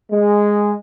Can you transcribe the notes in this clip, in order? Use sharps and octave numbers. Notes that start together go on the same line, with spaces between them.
G#3